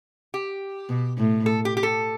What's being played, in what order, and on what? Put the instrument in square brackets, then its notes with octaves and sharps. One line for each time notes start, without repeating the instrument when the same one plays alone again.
[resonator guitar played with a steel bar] G4
[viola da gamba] B2
A2
[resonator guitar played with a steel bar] A4
G4
G4
A4